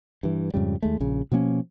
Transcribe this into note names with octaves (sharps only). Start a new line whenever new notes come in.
G2 E3
F2 G#2 C#3 G3
D#2 G#3 A3
A#1 C#3
B2 F3 A#3 C#4